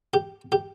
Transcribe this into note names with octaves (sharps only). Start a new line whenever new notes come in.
G4
G4